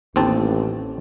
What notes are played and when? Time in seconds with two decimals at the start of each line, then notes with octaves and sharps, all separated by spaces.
0.16 A1 D#2 C4 A5